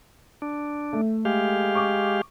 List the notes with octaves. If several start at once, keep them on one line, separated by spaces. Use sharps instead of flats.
D4
A3
G#3 G4 F5
C#6 D6